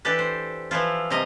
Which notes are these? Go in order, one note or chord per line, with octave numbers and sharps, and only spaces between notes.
E3 D4 G4 A4 B4
C5
E3 F3 E4 F4
C3 F3 G3 D#5 A#5